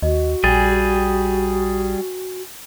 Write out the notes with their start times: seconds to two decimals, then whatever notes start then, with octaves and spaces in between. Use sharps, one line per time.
0.02 D#2 F#4 D#5
0.44 A#1 G3 G#4 G5 G#5 A6